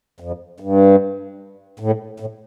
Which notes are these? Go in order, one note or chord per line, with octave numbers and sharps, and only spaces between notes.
F2
G2
A2
A2